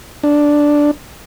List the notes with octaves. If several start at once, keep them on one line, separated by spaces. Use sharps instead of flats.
D4